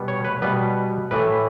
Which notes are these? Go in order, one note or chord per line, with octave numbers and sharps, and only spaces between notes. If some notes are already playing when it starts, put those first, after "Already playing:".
Already playing: B2 G3 B3
C#5
B4
B2 G3 B3 B4
A2 E3 A3 B4